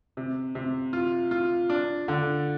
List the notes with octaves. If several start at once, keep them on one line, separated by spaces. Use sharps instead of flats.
C3
C3
F4
F4
D4
D3